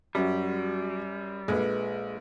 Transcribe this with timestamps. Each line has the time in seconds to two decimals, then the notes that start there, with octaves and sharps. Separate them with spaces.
0.15 F#2 F#3 G3 F#4
1.48 A#1 G#3 A4 B4